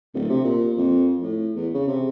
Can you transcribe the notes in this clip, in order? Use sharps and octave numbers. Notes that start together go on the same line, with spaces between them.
D1
C3
A#2
F2
A2
E2
C#3
C3